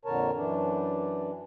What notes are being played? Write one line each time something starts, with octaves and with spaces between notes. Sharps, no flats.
F2 A#2 D3 A#4 C#5 A5
F#2 E3 D4